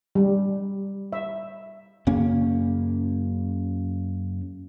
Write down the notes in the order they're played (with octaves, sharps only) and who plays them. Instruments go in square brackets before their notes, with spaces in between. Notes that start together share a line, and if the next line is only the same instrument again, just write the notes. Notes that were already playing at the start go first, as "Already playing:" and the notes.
[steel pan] G3
E5
[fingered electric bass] F#2 C#3 A#3 C#4